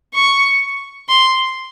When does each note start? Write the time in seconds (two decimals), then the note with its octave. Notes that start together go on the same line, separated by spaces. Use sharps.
0.15 C#6
1.09 C6